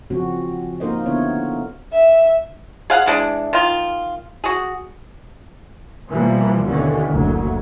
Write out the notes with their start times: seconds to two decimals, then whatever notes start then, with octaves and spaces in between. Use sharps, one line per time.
0.10 C#3 F3 C4 C#4 F#4
0.80 A#3 D#4 A#4 C5 D#5
1.06 D3 B3 E4 C#5
1.92 E5
2.90 G#4 F5 F#5
3.06 E3 G#3 D4
3.53 D#3 F4
4.44 F#4 G#4
6.09 B2 E3 F3 G3 A#3
6.65 D#2 B2 D3 E3 C#4
7.11 F#1 D2 F#3